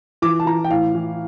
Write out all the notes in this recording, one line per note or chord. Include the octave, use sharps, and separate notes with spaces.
E3 D6
A5
E3 A#5
G5
A2 F5
E3